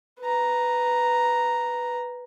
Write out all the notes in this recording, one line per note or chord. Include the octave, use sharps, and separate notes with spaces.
B4 A#5